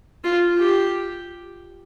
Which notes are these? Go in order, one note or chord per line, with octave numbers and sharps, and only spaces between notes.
F4
G4